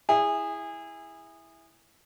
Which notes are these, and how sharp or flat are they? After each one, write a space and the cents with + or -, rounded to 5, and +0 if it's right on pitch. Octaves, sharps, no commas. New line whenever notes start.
E4 +0 G#4 -20